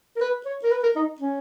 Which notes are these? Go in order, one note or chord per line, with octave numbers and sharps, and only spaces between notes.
A#4
B4
C#5
A#4
B4
A#4
D#4
C#4